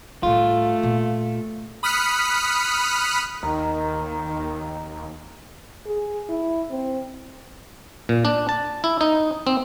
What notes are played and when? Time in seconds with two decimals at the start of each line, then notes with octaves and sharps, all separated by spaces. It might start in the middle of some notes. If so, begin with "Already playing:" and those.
0.23 A2 G3 A3 F4
0.83 A#2
1.83 B5 D#6 F6 F#6 B6 C#7
3.43 D#2 D#3 A#5
5.86 G#4
6.29 E4
6.71 C4
8.09 A#2
8.25 D4
8.49 A5
8.84 E4
9.01 D#4
9.47 C4